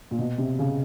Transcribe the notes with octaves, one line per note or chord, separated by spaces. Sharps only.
A#2
B2
C3
C#3